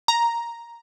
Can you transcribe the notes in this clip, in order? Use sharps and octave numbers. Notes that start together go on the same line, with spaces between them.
A#5